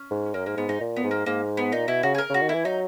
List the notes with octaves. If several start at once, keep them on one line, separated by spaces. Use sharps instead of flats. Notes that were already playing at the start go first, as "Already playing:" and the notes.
Already playing: C#4
G#2
F#2 A#3
G#2 A#3
G#2 B3
G#2 D#4
A#2
B3
G#2
A#3
G#2 A#3
B3
A#2 D#4
B2 E4
C#3 F#4
G#4
A#4
C#3 F#4
D#3
E3 E4
F#3 D#4